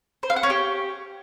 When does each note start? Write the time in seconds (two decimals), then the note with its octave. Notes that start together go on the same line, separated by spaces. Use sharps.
0.23 C5
0.30 F5
0.36 F#5
0.43 C#4
0.50 G4